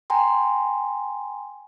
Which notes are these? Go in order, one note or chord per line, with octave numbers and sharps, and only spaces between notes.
G5 G#5 A#5 C6